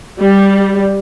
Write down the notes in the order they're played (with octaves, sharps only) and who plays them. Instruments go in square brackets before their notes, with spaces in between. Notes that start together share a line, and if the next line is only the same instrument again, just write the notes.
[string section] G3